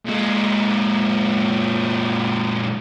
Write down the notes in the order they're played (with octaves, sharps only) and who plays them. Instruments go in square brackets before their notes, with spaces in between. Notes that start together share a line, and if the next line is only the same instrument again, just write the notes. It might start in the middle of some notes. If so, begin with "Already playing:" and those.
[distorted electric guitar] A#2 G#3